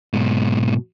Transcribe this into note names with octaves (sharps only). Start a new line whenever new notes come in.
G#2 B2